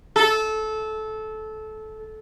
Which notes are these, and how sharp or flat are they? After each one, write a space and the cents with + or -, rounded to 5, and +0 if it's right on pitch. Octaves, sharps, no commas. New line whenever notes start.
A4 -20